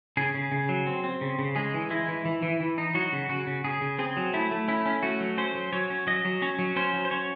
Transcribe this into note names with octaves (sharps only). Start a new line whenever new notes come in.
C#3 G#4
C#3
C#3
F#3
C4
C4
C#3
C#3
G#3 G#4
E3
G#3 E4
E3
E3
E3
E3
D#4
F#3 F#4
C#3
C#3 F#4
C#3
C#3 G#4
C#3
C4 G#4
F#3
A3 E4
A3
C#4 E4
C#4
A3 F#4
F#3
C#4 C5
F#3
F#3 C#5
C#4
F#3 D#5
F#3
C#4 C#5
F#3
C#4 C5
F#3
C5
C#4 C#5